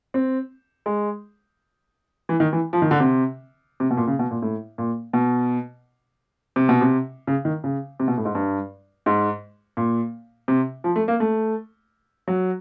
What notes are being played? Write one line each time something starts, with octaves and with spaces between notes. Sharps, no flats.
C4
G#3
E3
D#3
E3
F3
D#3
D3
C3
C3
B2
A#2
C#3
B2
A#2
A2
A#2
B2
C3
B2
C3
C#3
D#3
C#3
C3
B2
A2
G#2
G2
G#2
A#2
C3
F3
A3
A#3
A3
F#3